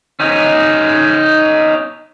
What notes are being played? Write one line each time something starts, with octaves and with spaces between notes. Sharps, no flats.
C#4 D#4